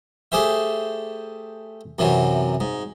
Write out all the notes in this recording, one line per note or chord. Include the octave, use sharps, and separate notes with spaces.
A3 G4 G#4 C5 E5
F#2 C3 E3 F#3
G#2